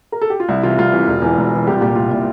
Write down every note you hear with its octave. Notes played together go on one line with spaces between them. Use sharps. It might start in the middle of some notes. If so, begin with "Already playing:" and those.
A#4
A4
G4
F4
C2 E4
C3 E3 F4
C2 F4
C3 E3
E1
E2 E3
E1
E2 E3
C2 G4
F4
A#2 G4
C2 F4
A#2 E4